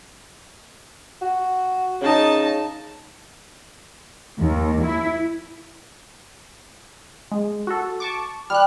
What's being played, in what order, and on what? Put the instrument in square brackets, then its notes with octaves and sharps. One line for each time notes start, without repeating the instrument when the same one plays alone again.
[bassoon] F#4
[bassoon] C#3 [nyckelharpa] D#4 A5
[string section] D#2
E4
[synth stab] G#3
F#4 A4
A5 C#6 D6
[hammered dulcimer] G3 [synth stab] F6 F#6